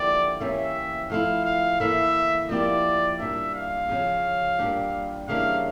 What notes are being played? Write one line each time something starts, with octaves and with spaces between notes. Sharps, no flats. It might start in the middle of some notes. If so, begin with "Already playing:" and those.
Already playing: D3 F3 A#3 E4 G4 D5
E3 A#3 C#4 G4 E5
F3 A3 E4 F5
F5
E3 A#3 E4 A4 E5
F3 A#3 E4 G4 D5
A#2 G3 D4 E5
F5
C#3 F3 C#4
A#2 G3 D4 G4
C#3 E3 G3 A#3 D4 F5